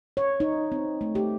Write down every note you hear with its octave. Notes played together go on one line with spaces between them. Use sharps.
C#5
D#4
C4
A3
G4